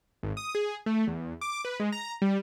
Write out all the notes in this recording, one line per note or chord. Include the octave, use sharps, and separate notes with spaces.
G#1
D#6
G#4
A3
E2
D6
B4
G#3
A#5
G3